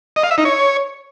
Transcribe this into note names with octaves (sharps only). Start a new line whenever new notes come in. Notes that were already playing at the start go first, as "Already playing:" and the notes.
D#5
F5
E5
D#4
C#5